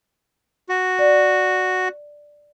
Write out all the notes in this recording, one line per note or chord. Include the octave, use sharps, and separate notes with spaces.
F#4
D5